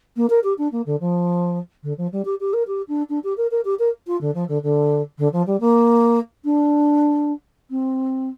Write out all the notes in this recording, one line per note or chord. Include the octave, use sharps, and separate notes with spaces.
A#3
A#4
G4
D4
A#3
D3
F3
D3
F3
G3
G4
G4
A#4
G4
D4
D4
G4
A#4
A#4
G4
A#4
F4
D3
F3
D3
D3
D3
F3
G3
A#3
D4
C4